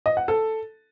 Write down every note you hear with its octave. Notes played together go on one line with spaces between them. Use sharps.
D#5
F#5
A4